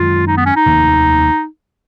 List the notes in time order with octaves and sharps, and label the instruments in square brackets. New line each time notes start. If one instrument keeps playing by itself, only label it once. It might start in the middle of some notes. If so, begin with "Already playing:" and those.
Already playing: [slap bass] F#2 D#3 G#3 [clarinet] F4
[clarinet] D#4
B3
C#4
D#4
[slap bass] F1 D#2 D#3 A#3